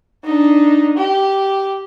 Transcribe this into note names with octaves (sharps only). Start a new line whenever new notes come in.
D4 D#4
G4